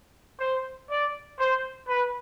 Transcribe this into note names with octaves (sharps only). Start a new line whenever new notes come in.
C5
D5
C5
B4